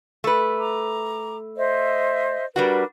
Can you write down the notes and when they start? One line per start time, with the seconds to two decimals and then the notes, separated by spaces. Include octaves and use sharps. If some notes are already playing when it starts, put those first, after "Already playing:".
0.24 A3 B4
0.60 A#5 D6
1.58 C5 D#5 E5
2.56 G3 D4 F#4 A#4 B4